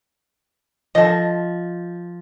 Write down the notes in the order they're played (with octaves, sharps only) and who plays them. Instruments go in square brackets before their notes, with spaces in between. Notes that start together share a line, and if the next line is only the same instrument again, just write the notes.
[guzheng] F3 [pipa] A4 D#5